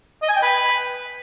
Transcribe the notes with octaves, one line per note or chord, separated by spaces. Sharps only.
D#5
G#5
G5
B4